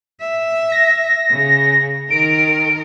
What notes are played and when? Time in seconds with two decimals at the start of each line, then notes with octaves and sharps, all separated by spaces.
0.21 E5
0.72 A#6
1.31 C#3
2.10 D#3 A#4 D7